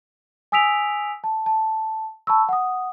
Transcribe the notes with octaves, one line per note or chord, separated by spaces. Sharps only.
G#5 D#6 E6 B6 D7 F7
A5
A5
A5 B5 C#6 E6
F#5 D#6